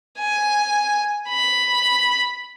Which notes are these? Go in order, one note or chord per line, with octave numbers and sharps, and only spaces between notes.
G#5
B5